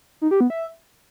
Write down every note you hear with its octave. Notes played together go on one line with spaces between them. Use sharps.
D#4
G4
B3
E5